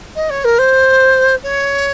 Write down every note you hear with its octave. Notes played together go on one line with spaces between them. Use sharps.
D#5
C#5
A#4
C5
C#5